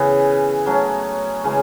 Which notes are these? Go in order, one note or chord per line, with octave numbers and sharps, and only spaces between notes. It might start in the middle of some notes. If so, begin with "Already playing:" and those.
Already playing: C#3 E3 B3
F#3 A3 C#4
C#3 E3 G#3 C#4